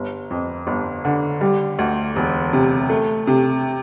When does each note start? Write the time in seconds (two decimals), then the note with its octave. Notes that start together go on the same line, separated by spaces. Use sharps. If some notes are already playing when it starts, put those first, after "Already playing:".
Already playing: G1
0.30 F2
0.67 G1
1.05 D3
1.41 G3
1.79 D2
2.16 E1
2.53 C3
2.89 A3
3.27 C3